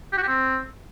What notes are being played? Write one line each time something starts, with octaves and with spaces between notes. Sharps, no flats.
G4
F#4
G4
C4